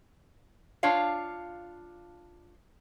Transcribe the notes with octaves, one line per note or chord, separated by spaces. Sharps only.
D4 F4 C#5 F5